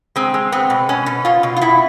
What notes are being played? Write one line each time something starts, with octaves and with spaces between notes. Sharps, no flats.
G#3 C4
G#3
B3 C4
B2
B2 C#4
B2
B2 F4
B2
F4
B2 E4